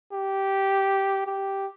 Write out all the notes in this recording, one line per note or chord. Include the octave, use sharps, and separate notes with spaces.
G4
G4